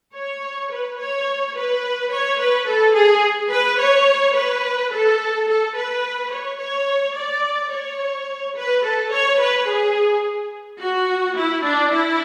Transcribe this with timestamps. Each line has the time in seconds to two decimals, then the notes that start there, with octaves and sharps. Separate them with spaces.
0.14 C#5
0.71 B4
0.98 C#5
1.55 B4
2.11 C#5
2.39 B4
2.67 A4
2.95 G#4
3.51 B4
3.80 C#5
4.35 B4
4.91 A4
5.48 A4
5.75 B4
6.31 C#5
6.59 C#5
7.16 D5
7.72 C#5
8.56 B4
8.84 A4
9.12 C#5
9.40 B4
9.68 G#4
10.80 F#4
11.36 E4
11.64 D4
11.92 E4